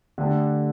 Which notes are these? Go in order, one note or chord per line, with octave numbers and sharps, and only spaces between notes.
D3 A3 D4 G4